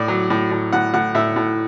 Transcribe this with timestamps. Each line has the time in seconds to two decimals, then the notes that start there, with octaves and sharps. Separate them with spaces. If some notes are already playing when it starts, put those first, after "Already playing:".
Already playing: A2 D5
0.08 F#3
0.30 A2
0.51 A2
0.73 A2 F#5
0.94 A2 F#5
1.15 A2 E5
1.36 A2